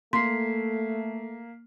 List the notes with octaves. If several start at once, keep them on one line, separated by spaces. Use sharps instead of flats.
A3 A#3 C6 B6 C7